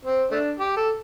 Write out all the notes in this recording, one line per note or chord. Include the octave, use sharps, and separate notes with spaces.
C4
A3 D4
G4
A4